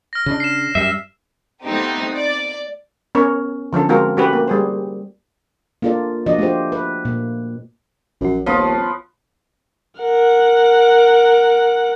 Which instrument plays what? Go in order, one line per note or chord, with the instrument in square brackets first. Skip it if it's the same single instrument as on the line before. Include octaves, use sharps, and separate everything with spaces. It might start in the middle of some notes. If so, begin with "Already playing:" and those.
[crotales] F6 A#6
[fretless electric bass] C#3 D4
[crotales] C7 E7
[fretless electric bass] F#2 G3 [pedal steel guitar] E5 [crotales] C7
[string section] A3 B3 C4 D#4 G4
D5
[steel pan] B3 C#4 A#4 C#5
D3 F3 C#4 A4
G#3 C4 F4 F#4 A#4
A3 C#4 F#4 G4 B4
A#3
G3 G#4 C5
[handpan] A#3 D4 F4 A4 D5
F3 D4 F#4 D5 D#5
A3 D4 F4 G4 C5
B4
A#2 A#3
[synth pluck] A#1 F3 F#4 [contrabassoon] F#2
[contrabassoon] D#1 [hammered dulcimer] F3 B3 F4 [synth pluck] C#5 C#6 D#6
[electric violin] A#4 F#5